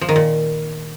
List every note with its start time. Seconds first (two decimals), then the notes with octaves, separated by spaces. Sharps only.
0.01 F3
0.09 D#3
0.16 A#2